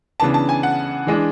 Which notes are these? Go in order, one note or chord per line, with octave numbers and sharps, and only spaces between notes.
C#3 E3 B3 D4 A5
A5
G#5
F#5
E3 G#3 D4